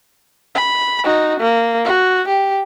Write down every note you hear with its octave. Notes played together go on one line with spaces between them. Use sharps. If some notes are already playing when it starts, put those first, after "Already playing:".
B5
D#4 F#4
A#3
F#4
G4